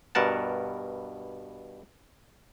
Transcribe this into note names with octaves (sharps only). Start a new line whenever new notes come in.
G2 B2 A#4 F#5 A5